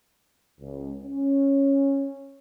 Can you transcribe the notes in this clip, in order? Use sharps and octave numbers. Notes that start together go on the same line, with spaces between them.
C#2
C#4